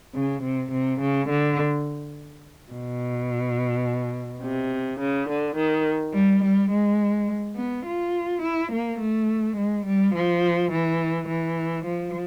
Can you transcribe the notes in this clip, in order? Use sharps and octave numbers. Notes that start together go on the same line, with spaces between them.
C#3
C3
C3
C#3
D3
B2
C3
C#3
D3
D#3
G3
G3
G#3
B3
F4
E4
A#3
A3
G#3
G3
F3
E3
E3
F3